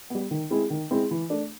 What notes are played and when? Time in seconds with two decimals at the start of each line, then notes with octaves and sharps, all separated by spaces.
0.10 G3 B3
0.31 D#3
0.50 G#3 C4 E4 G#4
0.70 D#3
0.91 G#3 C4 E4 G#4
1.11 E3
1.30 A3 D4